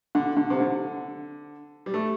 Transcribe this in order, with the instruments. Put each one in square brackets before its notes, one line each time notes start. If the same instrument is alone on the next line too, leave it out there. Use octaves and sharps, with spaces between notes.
[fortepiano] D3
D3
C3
D3
G3
A3